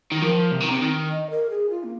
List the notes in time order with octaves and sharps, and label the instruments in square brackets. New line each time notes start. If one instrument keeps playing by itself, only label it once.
[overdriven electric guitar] D#3
[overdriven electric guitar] F3 [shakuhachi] A#4
[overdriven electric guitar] C3
D#3
C3
D#3
[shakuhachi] D#5
A#4
G#4
F4
A#3